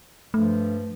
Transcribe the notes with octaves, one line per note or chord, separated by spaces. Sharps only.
G2 F3 A3